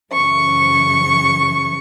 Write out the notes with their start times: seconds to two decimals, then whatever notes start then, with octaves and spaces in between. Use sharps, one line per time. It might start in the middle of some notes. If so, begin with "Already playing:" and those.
0.13 F#2 C#3 E3 C#6